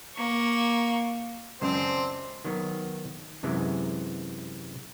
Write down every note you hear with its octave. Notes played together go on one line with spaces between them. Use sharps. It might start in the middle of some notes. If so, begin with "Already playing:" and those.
A#3 C#6
C#2 F#2 C4 D4 C5
D#3 F#3 B3
F#2 C3 E3 G#3